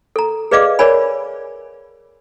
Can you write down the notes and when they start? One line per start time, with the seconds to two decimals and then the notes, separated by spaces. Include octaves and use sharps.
0.16 A4 A#5
0.51 G#4 B4 D5 D#5 F5 D6
0.79 A#4 C#5 D5 G#5 B5